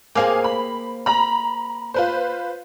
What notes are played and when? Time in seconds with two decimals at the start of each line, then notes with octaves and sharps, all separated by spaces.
0.15 A#3 C4 G#4 F5 G#5 D6
0.44 B5
1.06 A#5 B5
1.94 F4 B4 C5